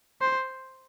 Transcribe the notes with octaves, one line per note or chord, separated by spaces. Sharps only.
C5